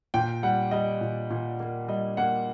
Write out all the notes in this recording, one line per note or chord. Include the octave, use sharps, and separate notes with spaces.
A#2 G5
G3 F#5
G3 D#5
A#2
A#2
A#3
G3 D#5
A#3 F#5